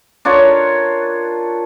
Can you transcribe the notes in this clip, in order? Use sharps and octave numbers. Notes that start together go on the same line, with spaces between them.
D4 F4 A#4 C#5